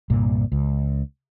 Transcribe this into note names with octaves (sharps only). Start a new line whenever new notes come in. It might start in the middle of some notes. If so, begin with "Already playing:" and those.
C2 G2 A#2 A#3
C#2